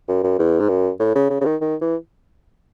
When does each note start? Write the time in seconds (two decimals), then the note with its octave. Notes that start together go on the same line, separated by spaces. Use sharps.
0.08 F#2
0.23 F#2
0.39 E2
0.59 G#2
0.69 F#2
0.99 A2
1.15 C#3
1.30 C#3
1.41 C#3
1.45 D#3
1.61 D#3
1.81 E3